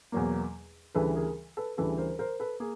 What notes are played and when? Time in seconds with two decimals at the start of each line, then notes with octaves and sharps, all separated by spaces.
0.12 E2 B2 F#3 A#3
0.95 D2 C#3 E3 G3 A4 B4
1.15 G#4 A#4
1.57 A4 B4
1.77 D2 C#3 E3 G3 A4 B4
1.98 A#4 C5
2.19 A#4 C5
2.40 A4 B4
2.60 A#3 G#4